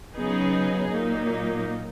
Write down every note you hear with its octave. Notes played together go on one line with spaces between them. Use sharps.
C#3 F#3 B3 D#4 G#4
A#2 F#3 A#3 D#4